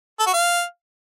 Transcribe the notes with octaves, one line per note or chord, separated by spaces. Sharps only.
A4
F#4
F5